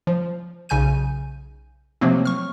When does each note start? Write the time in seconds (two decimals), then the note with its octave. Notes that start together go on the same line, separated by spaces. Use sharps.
0.07 F3
0.69 B1 C#3 G#5 G6 D#7
2.01 C3 F3 F#3 A3 A#3 C4
2.25 C#6 F6